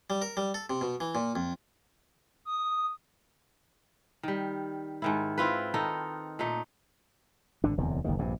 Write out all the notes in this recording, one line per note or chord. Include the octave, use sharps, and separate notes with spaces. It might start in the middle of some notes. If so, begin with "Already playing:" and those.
G3
A#4
G3
A4
C3
B2
E3
A#2
F2
D#6
D#3 G3
G#2 D#3 E4
C4 E4 F4 B4
D#3 D#4 A4
A#2 A3 D#4
G#1 D3 D4
D1 E2 C3
F#1 D#2 D#3
A#1 G2 C3